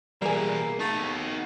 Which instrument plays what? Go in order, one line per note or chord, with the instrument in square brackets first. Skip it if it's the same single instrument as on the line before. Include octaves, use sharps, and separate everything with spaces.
[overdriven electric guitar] B2 E3 [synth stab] G3 G#4 [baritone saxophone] A#3
[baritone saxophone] A3 [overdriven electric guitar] D#4 F#4
[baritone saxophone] D#2